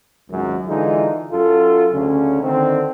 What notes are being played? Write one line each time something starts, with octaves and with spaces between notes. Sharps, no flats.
G#1 C#2 F#2
D3 E3 G#3 D#4 F4
F#2 F4 A4
D2 C#3 C#4
D3 D#3 C4